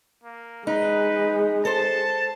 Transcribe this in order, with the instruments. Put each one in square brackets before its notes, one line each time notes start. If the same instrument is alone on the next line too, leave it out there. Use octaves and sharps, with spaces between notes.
[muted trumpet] A#3
[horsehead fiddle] G#3 [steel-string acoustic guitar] D#4 [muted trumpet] B4
[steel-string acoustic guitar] A4 C5 [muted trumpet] A5